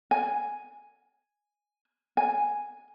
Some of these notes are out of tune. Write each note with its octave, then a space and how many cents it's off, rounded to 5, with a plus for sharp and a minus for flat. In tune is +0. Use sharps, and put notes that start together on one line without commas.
G#5 +0
G#5 +0